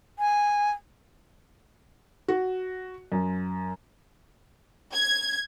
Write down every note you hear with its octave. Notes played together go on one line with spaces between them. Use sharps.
G#5
F#4
F#2
G#6